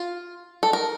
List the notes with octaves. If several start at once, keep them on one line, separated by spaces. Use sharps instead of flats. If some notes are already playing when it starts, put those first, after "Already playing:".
Already playing: F4
A4
A#4